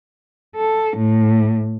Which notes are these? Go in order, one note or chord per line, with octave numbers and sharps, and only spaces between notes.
A4
A2